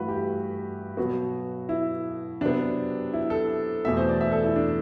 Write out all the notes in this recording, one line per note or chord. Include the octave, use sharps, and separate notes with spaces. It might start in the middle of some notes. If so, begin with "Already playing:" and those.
Already playing: G2 E3 A3 F#4 B4
G4
B2 F#3 B3 F#4
E4
C3 F#3 B3 D4
E4
A4
E2 B2 A3 E5
C5
D5
E5
A4
E4
D4